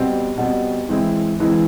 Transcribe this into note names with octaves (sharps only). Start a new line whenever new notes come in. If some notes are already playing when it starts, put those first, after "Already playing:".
Already playing: B2 G3 C4
B2 G3 C4
E3 G#3 C4 E4
E3 G#3 C4 E4